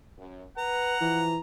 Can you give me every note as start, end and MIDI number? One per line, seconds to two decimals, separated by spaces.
0.18 0.42 42
0.58 0.94 71
0.58 1.25 78
0.58 1.39 82
1.01 1.39 52
1.01 1.32 53